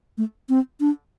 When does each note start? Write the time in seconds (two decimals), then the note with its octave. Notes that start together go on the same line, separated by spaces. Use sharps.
0.18 A3
0.49 C4
0.80 D4